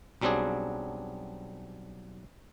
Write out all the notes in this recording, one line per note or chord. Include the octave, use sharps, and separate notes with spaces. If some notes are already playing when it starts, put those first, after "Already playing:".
B1 F#3 G3 C4 D4 G#4